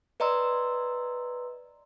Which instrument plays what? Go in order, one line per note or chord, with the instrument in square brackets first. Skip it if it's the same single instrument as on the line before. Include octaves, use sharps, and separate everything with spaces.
[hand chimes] B4 D5 D#5 A#5 C6 E6